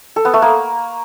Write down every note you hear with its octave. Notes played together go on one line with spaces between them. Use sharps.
A4
B3
A3
A#3